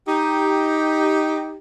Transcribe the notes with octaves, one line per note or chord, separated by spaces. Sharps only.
D#4 G4